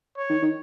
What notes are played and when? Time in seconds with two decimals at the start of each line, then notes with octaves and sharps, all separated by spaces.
0.17 C#5
0.29 D#3
0.42 D#3